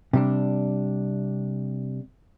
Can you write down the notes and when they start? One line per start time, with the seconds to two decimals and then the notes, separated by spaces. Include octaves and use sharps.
0.13 C3 G3 D4